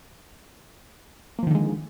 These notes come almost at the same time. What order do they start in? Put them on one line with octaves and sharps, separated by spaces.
A#3 F3 D#3 D3 G#3